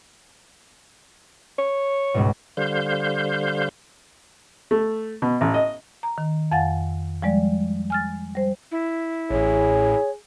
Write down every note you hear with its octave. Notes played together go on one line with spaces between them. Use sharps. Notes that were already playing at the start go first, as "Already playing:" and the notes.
C#5
C#2 G#2 B2
D3 G3 C5 F5 G6
A3
B2
A1
D#5
A#5
D#3
F2 F5 F#5 G#5 A6
F3 G3 G#3 D5
G#5 F6 A6
G3 C5
E4
A1 A2 G#4 C#5